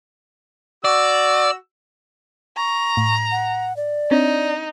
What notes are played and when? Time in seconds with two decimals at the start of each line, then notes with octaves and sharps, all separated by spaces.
0.85 F#4 D5 E6
2.57 A#5 C#6
2.97 A2
3.32 F#5
3.77 D5
4.11 C4 D4 D#4 C#5